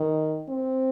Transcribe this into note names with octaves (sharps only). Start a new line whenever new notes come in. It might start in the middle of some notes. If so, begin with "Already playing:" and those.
Already playing: D#3
C4